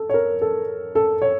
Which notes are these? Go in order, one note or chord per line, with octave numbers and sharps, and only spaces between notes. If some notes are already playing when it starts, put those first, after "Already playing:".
Already playing: A4
C#5
A#4
A4
A4
C#5